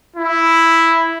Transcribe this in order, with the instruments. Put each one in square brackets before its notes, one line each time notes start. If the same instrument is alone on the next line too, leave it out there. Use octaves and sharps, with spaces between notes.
[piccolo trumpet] E4